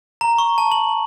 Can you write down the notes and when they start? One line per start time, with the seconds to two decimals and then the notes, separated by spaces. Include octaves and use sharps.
0.21 A#5
0.38 C#6
0.58 A5
0.72 F#7